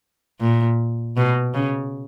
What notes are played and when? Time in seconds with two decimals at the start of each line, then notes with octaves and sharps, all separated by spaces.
0.40 A#2
1.17 B2
1.54 C#3